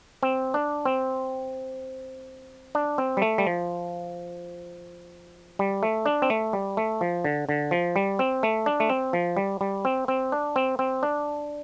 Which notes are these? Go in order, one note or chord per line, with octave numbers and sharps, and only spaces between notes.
C4
D4
C4
D4
C4
G3
A3
G3
F3
G3
A3
D4
C4
A3
G3
A3
F3
D3
D3
F3
G3
C4
A3
D4
A3
C4
F3
G3
G3
C4
C4
D4
C4
C4
D4